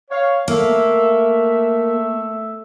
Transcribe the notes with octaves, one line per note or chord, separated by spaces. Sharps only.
C#5 F5
A3 A#3 E5